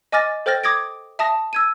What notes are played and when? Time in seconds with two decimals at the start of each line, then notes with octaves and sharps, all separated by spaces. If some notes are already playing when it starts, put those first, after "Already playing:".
0.12 D#5 G#5 D6 F6 A6 A#6
0.46 A4 C5 G5 F6 A6 A#6
0.64 D6 D#6 G#6 A#6 D7
1.19 E5 A5 D#6 A#6
1.53 E6 G#6 D#7